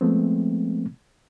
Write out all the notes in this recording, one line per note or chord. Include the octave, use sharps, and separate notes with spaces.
F3 G#3 A3 B3 C4